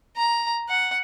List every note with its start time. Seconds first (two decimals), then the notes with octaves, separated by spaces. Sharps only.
0.17 A#5
0.69 F#5